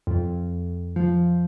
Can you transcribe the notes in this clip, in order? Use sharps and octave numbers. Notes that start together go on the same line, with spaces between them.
F2
F3